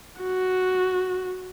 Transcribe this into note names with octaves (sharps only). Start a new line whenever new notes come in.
F#4